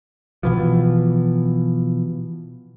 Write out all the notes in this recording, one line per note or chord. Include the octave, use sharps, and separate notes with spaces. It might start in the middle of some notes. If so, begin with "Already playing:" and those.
B2 E3 F3